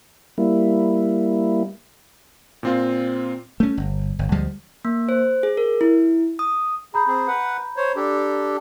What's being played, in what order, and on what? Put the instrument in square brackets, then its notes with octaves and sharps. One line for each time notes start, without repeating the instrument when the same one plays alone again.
[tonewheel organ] G3 A#3 E4
[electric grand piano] A#2 C4 F4
[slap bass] A3 C#4
G1
G1
D2 F3 G3 G#3
[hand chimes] A#3
C5
G#4
A#4
E4
D#6
[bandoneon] G#4 [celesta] A#5 B5 G6
[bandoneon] C4 G#4
B4 F#5
C5 C#5
D4 G4 A4